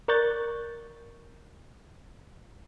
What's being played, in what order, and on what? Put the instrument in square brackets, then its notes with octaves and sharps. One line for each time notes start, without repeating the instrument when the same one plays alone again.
[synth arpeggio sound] A#4 D5 C#6 F#6 G6 A6